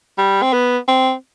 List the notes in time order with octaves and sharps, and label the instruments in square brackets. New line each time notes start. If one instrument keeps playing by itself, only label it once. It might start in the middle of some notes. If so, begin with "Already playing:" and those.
[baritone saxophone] G3
C4
B3
C4